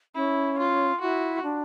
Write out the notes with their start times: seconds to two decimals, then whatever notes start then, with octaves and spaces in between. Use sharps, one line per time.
0.14 C#4 E4
0.58 F4
1.01 F4 F#4
1.04 E4
1.43 D4